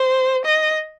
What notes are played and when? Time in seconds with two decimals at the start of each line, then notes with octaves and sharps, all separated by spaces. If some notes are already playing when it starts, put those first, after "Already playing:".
Already playing: C5
0.45 D#5